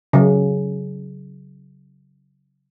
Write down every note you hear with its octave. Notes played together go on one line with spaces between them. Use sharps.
C#3 F#3